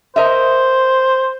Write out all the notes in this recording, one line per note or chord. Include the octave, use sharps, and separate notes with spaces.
A#4 C5 D#5 E5